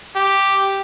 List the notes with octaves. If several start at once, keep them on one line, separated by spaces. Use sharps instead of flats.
G4